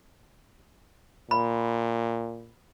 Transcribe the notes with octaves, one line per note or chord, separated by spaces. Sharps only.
A#2 B5